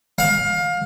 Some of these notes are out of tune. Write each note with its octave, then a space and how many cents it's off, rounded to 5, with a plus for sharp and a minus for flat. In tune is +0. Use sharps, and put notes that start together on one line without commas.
F5 +25